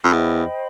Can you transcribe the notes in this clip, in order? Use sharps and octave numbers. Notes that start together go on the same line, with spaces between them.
F2
E2 C5 D#5 G5 B5